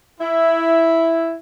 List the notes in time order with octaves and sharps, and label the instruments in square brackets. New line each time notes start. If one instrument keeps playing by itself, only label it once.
[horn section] E4